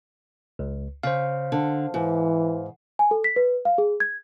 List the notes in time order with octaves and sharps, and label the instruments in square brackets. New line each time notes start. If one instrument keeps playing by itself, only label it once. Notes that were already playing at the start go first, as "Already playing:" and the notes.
[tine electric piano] C#2
[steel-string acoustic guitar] C#3 [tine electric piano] C5 F5
[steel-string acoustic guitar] D3
[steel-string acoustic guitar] G#2 [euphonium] E3
[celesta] G#5
A4
B6
B4
F5
G#4
G#6